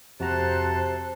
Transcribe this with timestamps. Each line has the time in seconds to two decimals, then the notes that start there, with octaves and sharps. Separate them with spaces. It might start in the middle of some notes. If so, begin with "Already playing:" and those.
0.20 F2 C3 F#4 A4 C5 A5 A#5 F#6